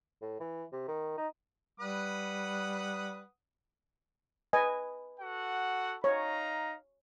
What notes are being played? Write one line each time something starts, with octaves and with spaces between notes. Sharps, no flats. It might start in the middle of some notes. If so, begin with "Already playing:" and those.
A2
E3
C3
D#3
D#4
G3 B4 F#5 D#6
B4 D#5 G#5
F#4 A4 F#5
D#4 C#5 F5 A#5